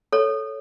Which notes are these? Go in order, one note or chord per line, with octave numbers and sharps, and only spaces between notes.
A4 C#5